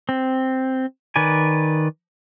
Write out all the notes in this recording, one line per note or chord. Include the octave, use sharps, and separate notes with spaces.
C4
D#3 B4 D5 G#5